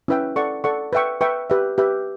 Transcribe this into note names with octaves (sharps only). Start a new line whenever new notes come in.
C#4 E4 B4 E5 G5
A4 D5 F#5 C#6
A4 D5 F#5 C#6
B4 E5 G5 C#6
B4 E5 G5 C#6
G4 B4 E5
G4 B4 E5